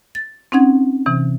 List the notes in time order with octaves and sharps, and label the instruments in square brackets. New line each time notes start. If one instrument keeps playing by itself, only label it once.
[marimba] A6
C4 C#4 D#4 F#5 G#6
C3 E3